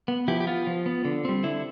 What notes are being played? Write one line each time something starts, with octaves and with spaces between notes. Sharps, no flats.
B3
F3 E4 G4
G4
B3 F4
F3
B3
D3
G3 C4
D3 E4